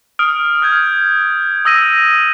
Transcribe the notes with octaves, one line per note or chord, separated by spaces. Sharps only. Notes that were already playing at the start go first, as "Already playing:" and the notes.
D#6 F6 D7
F6 G6 G#6
D#6 E6 A#6 D#7